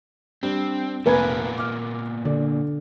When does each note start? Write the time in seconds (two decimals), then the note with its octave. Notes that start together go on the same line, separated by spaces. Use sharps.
0.43 G3 C4 D4
1.06 F1 A#2 A#3 B3 A#4 B4 G#5 G#6
1.58 D6 F6
2.25 D3 D5